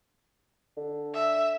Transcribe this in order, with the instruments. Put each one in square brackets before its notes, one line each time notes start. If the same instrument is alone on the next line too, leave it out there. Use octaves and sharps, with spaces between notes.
[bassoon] D3
[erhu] E5